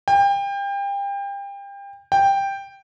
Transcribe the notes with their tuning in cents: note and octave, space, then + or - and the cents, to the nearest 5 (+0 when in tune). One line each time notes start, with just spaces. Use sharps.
G5 +30
G5 +5